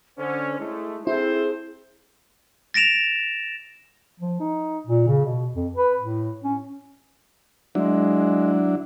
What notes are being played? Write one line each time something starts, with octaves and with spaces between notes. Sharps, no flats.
D3 C#4 C5
G#3 A3 E4
C4 E4 G#4 A4 C5
A6 A#6 D7 E7 F7
F3
D#4
A#2
C#3
B2
F2
B4
A2
C#4
F#3 G#3 D4 E4